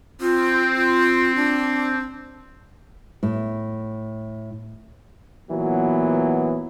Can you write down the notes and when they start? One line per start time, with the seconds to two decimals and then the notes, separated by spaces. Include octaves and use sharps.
0.21 C4 F4
0.74 F4
1.36 D4
3.23 A2
5.50 A#2 E3 F#3 B3